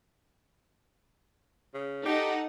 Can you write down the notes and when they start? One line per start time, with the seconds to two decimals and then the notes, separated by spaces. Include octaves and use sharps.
1.74 C#3
2.06 D#4 G4 A4 F#5